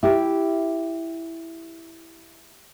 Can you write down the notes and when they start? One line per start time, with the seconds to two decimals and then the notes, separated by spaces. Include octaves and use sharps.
0.03 E4 G4